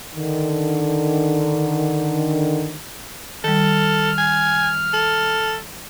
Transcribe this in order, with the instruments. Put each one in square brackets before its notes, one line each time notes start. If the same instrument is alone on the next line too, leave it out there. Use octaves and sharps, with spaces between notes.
[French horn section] D3 D#3
[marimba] D#3 G3 [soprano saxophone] A4 [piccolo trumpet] F6
[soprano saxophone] G#5
A4